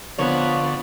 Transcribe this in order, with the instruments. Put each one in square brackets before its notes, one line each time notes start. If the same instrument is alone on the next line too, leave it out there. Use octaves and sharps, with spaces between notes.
[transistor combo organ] D3 [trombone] F3 [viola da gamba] B3 [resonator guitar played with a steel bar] C#5